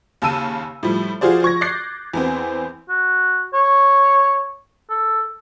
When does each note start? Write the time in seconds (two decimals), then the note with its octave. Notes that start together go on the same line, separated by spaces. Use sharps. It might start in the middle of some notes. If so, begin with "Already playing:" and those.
0.22 D#2 C#3 A5 E6 D#7
0.83 A2 F3 G3
1.21 F3 F4 F#4 G#4 C5 D5
1.43 F3 C#6 G#6 A#6
1.61 D6 F#6 G6 A6 A#6 C7
2.14 E2 B3 C4
2.89 F#4
3.54 C#5
4.90 A4